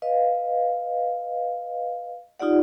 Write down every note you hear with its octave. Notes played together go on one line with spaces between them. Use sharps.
B4 D#5 F5
D#4 F4 G4 D5 F#5